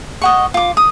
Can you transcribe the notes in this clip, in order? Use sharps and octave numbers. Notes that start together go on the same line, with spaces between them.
D#5 F#5 C#6
F4 D6
D#6